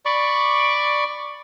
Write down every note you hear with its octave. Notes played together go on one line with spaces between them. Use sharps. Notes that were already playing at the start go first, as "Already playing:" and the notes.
D5 B5 C#6 D6